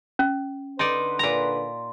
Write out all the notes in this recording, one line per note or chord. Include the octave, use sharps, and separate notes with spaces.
C#4
D3 D#4 B4 D5 C6
A#2 A#5